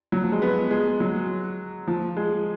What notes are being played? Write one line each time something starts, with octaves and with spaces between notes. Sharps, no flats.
F#3
F3
G#3
B3
G#3
F#3
F3
G#3